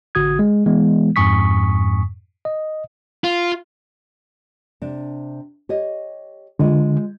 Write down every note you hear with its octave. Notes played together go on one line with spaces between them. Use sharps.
A1 D3 F#4 D#6 G#6
G#3
E3 G#3 B3
F2 G#2 G#5 C#6 D#6 B6
D#5
F4
C3 D4
G4 C#5 D#5
D3 G#3 F4